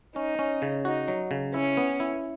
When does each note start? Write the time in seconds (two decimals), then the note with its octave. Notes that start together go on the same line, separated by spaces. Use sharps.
0.16 C#4 D#4
0.39 C#4
0.62 C#3
0.85 D#4 F#4
1.08 F#3
1.31 C#3
1.54 C#4 E4
1.77 B3
2.00 E4